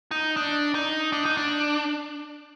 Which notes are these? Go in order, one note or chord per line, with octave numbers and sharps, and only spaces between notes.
D#4
D4
D#4
D4
D#4
D4